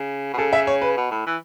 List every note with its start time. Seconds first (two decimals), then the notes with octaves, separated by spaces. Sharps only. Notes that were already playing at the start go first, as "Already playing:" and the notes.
Already playing: C#3
0.34 B2
0.37 C#3 A4
0.53 E5
0.67 C#5
0.82 B4
0.97 B2
1.11 A2
1.27 E3